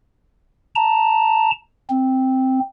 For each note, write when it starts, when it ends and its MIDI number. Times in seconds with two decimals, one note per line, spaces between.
0.76 1.51 81
0.76 1.51 82
1.90 2.60 60